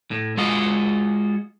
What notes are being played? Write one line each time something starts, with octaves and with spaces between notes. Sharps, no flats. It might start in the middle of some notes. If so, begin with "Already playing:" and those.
A2
G#3 F4 F#4 D#5